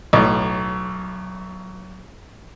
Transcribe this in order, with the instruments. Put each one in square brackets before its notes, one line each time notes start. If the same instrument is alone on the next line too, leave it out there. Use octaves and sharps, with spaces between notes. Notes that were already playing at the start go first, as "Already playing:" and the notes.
[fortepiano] B1 A2